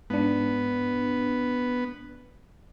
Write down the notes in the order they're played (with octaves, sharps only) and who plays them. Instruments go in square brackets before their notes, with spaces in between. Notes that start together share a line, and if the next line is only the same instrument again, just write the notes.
[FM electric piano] G#2 D4 [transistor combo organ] B3